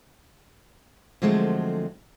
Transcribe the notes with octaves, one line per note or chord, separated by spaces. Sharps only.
D3 F3 F#3 G#3 A3 C4